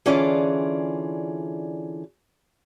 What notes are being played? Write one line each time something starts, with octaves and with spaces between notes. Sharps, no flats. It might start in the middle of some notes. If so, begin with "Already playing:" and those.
D3 E3 C#4 F4 G#4 D5